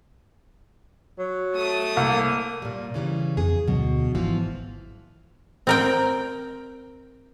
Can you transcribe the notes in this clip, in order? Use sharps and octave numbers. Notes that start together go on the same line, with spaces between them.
F#3
A3 D#6
C2 A#3
A#2 G3
C#3 E3 G3
F2 G#4
D2 B2 F#3
G#1 E3 F3
C4 A#4 G5